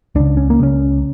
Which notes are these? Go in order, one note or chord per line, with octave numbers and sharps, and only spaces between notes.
C#2 C#3 D4
C#4
A#3
C#2 C#3 C#4